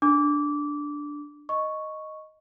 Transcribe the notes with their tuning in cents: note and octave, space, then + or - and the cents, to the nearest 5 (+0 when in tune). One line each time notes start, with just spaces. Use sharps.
D4 +0 D6 -20
D#5 +0 C#6 +0